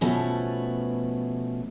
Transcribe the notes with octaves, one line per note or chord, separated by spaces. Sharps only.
B2 F3 A3 C#4 B4